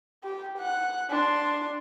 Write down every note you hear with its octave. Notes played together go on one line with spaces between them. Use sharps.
G4
F#5 F#6
D4 C6